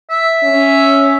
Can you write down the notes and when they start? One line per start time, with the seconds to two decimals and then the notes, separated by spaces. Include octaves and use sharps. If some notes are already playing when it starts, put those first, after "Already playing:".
0.10 E5
0.43 C#4